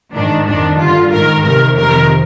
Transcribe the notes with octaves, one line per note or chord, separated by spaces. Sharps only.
G#2 D#3 D4
F2 D#3 D4
G2 D3 F4
G#2 D#3 A#4
F2 C3 D#3 A#4
F2 C3 D#3 A#4